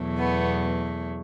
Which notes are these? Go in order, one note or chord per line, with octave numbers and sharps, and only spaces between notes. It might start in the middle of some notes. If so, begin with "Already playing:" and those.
Already playing: E2 B2 F#3 A3
B3